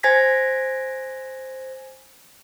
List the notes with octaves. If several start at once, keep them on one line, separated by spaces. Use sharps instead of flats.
C5 G#5 G#6 A#6 B6